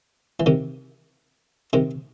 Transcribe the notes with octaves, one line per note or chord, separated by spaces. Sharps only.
E3
C3 D#3
C3 D#3